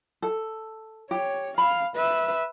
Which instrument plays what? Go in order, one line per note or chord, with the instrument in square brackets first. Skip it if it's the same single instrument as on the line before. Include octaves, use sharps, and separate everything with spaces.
[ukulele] A4
[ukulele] G4 [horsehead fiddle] C#5
[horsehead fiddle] F5 [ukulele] B5
[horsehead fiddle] B4 E5